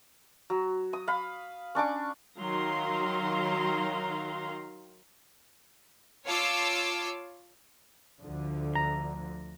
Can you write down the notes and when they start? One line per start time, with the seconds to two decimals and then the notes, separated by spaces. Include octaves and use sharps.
0.50 F#3
0.93 D#6
1.08 F5 B5
1.75 C#4 D4 C#6 D6
2.36 D#3 F#3 F5 A#5 C6
6.24 F4 C#5 F5 A5 D6 E6
8.22 D2 D3 F3
8.75 A#5